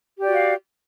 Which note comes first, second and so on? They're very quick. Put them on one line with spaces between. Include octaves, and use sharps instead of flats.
G4 D5 F#4 F5